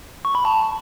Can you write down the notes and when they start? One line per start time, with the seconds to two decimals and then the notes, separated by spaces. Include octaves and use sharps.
0.25 C#6
0.35 B5
0.45 A5